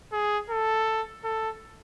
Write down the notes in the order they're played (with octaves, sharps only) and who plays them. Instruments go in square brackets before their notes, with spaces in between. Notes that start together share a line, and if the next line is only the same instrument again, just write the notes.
[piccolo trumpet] G#4
A4
A4